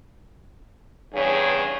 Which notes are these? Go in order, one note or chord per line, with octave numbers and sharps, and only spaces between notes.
E2 G2 C#3 G#4 C#5